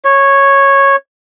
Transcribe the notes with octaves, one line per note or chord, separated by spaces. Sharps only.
C#5